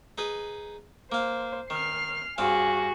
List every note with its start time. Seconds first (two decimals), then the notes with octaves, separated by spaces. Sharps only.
0.18 D#4 G#4 B4
1.12 A#3 C5 F5
1.70 D#3 F6 C7
2.38 G2 C4 F#4 G#4 F5